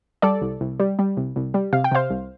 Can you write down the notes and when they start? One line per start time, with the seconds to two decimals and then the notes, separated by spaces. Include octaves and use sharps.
0.22 G3 A4 D5
0.41 C2
0.61 C2
0.80 G3
0.99 G3
1.17 C2
1.36 C2
1.54 G3
1.73 C3 F5
1.84 G5
1.91 C3 C5 F5
2.10 C2